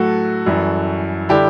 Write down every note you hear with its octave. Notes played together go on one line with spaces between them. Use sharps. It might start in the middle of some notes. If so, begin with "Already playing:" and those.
Already playing: A2 F#3 A3 F#4 A4
F#2 E3 G3
D3 G3 E4 G4